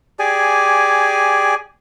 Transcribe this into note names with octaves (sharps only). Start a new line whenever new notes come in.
G4 G#4 D5 G#5